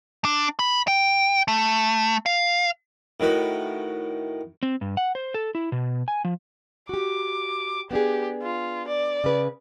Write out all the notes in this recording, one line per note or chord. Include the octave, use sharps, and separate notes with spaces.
D4
B5
G5
A3
F5
A2 D#3 F#4 B4
C4
G2
F#5
C5
A4
E4
B2
G#5
F3
F#4 G4 D6
B3 D4 G4 G#4
F4
D5
C#3 B4